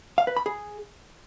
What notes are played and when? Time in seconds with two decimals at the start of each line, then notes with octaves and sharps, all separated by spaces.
0.18 F5
0.27 B4
0.37 B5
0.46 G#4